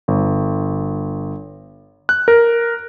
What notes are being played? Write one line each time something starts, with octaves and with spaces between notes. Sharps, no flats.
G1
F#6
A#4